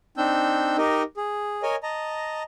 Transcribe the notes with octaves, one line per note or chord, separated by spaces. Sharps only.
C4 D4 D#4 E6 G6
D#4 G4 A#4 D#5
G#4
A#4 C#5 D#5 G#5
D#5 A5 A#5